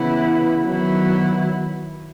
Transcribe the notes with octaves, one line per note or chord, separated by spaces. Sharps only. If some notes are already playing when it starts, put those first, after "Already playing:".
Already playing: C#3 E3 B3 E4
D#3 F#3 B3 E4